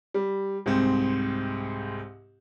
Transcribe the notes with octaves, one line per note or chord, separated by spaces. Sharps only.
G3
C2 G#2 C4